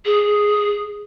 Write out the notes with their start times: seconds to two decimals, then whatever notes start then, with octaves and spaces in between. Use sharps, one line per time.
0.05 G#4